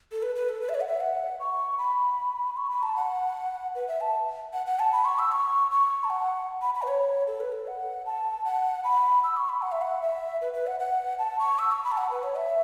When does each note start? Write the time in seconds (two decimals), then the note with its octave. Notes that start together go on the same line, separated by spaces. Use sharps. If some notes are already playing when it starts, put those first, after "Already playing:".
0.12 A4
0.22 B4
0.35 B4
0.49 A4
0.61 B4
0.69 E5
0.75 C#5
0.81 F#5
0.88 E5
1.00 F#5
1.40 C#6
1.78 B5
2.57 C#6
2.70 B5
2.83 A5
2.96 F#5
3.75 B4
3.88 E5
4.01 A5
4.53 F#5
4.66 F#5
4.79 A5
4.92 B5
5.05 C#6
5.19 E6
5.32 C#6
5.71 C#6
6.04 A5
6.10 F#5
6.62 B5
6.75 B5
6.82 B4
6.88 C#5
7.27 A4
7.40 B4
7.52 A4
7.67 F#5
8.06 A5
8.45 F#5
8.84 B5
9.24 E6
9.37 C#6
9.49 B5
9.62 F#5
9.72 E5
9.82 F#5
10.02 E5
10.41 B4
10.53 B4
10.67 F#5
10.80 F#5
11.19 A5
11.39 C#6
11.59 E6
11.72 C#6
11.84 B5
11.92 A5
11.97 F#5
12.11 B4
12.23 C#5
12.37 E5